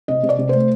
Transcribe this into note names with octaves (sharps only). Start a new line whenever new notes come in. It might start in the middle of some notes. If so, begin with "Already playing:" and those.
C3 D#5
C3
D5
C3
A3 C5